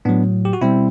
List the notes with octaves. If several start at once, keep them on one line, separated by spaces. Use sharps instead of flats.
A2 F#3 B3 D4
G4
F#4
B2 G3 C4 E4